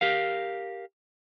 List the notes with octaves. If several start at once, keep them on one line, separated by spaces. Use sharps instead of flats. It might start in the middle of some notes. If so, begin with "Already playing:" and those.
G4 A#4 F5